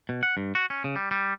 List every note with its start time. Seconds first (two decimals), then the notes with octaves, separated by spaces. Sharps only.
0.09 B2
0.23 F#5
0.37 G2
0.55 F#4
0.70 C#4
0.84 C#3
0.96 G3
1.11 G3